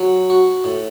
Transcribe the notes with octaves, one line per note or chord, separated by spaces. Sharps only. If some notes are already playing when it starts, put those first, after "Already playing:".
Already playing: F#3
F#4
A2